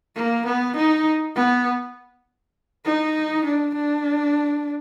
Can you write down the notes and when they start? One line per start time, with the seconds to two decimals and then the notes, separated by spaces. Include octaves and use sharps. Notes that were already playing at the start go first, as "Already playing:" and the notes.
0.16 A#3
0.46 B3
0.77 D#4
1.36 B3
2.85 D#4
3.45 D4
3.75 D4